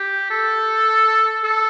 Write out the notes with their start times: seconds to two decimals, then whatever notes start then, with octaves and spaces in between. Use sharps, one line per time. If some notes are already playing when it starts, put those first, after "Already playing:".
Already playing: G4
0.30 A4
1.43 A4